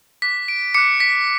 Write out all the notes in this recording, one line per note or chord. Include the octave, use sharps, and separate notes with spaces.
D6 F#6 B6
D7
D6 F#6 C#7
B6